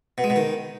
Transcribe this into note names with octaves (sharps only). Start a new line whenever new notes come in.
B2
G#3
B2
D#3